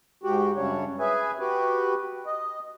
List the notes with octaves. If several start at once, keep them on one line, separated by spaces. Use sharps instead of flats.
G#2 F#4 G4
F#2 C#3 G3 D4 C#5
G#4 B4 E5 G#5
F#4 G4 B4
D#5